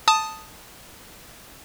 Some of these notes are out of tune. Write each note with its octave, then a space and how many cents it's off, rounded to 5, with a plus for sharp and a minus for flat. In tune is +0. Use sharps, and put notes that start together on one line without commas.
A5 +0 D#6 +0